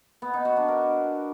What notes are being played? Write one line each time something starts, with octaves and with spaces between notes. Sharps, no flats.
B3
D#4
F#4
D4
A#4